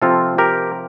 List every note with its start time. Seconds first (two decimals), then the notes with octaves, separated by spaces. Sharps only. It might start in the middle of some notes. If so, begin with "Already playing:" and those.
0.02 C3 F3 C4 F4 A4
0.38 G4 A#4